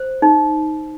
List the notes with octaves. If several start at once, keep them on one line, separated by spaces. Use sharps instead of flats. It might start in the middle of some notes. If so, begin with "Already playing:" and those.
Already playing: C5
D#4